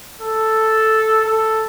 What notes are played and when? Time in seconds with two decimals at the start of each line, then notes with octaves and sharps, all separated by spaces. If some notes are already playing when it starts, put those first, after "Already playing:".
0.21 A4
1.26 A4